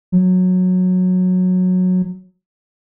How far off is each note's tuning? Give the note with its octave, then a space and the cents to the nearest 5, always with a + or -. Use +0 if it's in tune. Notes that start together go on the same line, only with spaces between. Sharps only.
F#3 -15